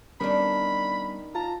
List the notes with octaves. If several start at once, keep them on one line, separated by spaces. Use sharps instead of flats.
D#3 G3 B3 C#4 D4 B5
F4 A5 A#5